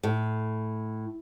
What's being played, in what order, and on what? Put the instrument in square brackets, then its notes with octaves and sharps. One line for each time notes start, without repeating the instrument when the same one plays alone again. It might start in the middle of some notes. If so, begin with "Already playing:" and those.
[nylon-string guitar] A2